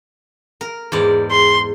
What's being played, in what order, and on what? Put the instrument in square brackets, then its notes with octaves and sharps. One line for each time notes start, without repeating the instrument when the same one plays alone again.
[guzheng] A#4
E2 G#2 D5
[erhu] C6